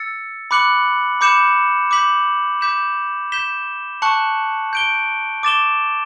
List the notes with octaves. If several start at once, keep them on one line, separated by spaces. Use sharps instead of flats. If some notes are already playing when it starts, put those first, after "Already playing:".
Already playing: E6 A6 C#7
B5 D6 F#6 C#7 F#7
B5 D6 G6 C#7 E7
D6 G6 B6 F#7
D6 G6 B6 E7
G6 B6 E7 G7
A5 C#6 F#6 C#7 F#7
G6 D7 G7
D6 A6 E7 G7